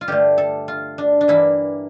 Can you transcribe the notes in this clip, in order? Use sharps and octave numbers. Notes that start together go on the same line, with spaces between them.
F4
G2 D3 A3 G4
A4
F4
D4
D4
G2 E3 A#3 E4